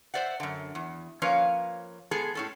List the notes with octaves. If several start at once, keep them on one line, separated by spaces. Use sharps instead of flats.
C5 D5 E5 F#5
F#2 D3
E2
F3 A#3 C#4 B4 C#5 F5
G#3 B3 G#4 A4
A2 C#4 A4